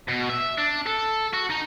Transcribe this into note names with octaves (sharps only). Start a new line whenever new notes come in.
B2
E5
D4
A4
F#4
D#4